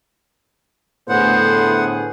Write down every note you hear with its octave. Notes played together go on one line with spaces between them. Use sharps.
A2 D3 B3 G#4 C5 F#5